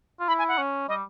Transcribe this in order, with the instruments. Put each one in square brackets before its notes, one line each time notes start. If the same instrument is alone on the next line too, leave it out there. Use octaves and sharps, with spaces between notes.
[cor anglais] F4
[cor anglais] E4 [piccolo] B5
[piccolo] G#5
F#5
[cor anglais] C#4
[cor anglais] G3 [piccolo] D#5